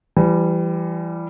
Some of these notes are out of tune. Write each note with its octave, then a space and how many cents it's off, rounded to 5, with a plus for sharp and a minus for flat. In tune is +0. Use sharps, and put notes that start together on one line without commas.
E3 +35 G3 +0